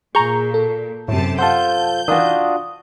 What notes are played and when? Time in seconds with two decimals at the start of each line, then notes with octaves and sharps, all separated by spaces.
0.15 A#2 G#4 A#5 C#6 G6
0.54 A4
1.08 F#2 A2 C3 A5
1.39 F4 A4 C5 F#5 A5 G6
2.08 D#3 E3 D4 F4 F#4 D#6